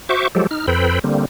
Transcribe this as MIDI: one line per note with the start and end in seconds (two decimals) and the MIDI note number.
0.09 0.28 66
0.09 0.28 72
0.09 0.28 76
0.09 0.28 85
0.09 0.28 86
0.35 0.47 53
0.35 0.47 54
0.35 0.47 56
0.35 0.47 67
0.35 0.47 69
0.51 0.66 63
0.51 0.66 89
0.67 0.99 41
0.67 0.99 69
0.67 0.99 71
0.67 0.99 72
0.67 0.99 79
0.67 0.99 83
1.04 1.25 50
1.04 1.25 55
1.04 1.25 58
1.04 1.25 60